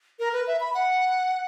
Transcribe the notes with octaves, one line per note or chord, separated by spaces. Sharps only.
A#4
B4
E5
B5
F#5